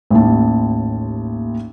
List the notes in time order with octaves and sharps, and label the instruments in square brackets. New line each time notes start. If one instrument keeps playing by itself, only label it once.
[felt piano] A1 D#2 A5